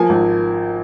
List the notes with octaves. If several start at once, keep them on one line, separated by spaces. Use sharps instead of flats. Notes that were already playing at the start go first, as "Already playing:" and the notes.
Already playing: F3 A#3 G#5
G#1